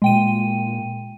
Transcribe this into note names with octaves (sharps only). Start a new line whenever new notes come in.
A#2 G#3 G5 D#7